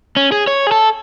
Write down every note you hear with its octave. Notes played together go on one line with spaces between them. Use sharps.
C#4
G#4
C#5
G#4
A4